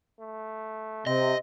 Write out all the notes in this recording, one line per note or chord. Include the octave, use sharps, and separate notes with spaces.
A3
C3 C4 D#5